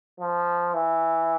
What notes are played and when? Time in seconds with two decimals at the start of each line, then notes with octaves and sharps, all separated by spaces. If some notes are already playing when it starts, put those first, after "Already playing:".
0.20 F3
0.74 E3